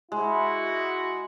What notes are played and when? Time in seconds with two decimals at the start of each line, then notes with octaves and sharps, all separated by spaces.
0.12 G#3 E4 F#4